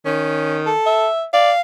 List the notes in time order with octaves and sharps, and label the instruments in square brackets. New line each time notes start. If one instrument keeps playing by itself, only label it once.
[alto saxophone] D#3 [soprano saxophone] C#4
[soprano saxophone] A4
[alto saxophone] E5
[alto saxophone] D5 [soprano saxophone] F5